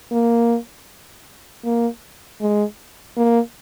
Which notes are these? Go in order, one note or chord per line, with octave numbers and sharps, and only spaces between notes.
A#3
A#3
G#3
A#3